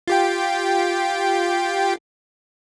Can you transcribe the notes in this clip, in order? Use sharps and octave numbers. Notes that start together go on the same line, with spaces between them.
F4 G4 G5